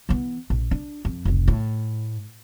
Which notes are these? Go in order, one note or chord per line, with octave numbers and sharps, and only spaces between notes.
E3 B3
A#1
D4
F2
F1 C#2
A2